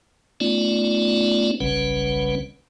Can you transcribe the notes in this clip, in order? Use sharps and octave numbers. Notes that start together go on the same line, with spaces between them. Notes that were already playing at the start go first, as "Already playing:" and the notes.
A3 B3 C#4 D#4 F4 D5
F#1 B1 C#3 G3 C#4 B4